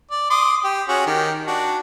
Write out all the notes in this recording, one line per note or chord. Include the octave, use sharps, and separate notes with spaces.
D5
C6 D6 D#6
G4
C#4 F#4 G#4
D#3 G4
D4 F#4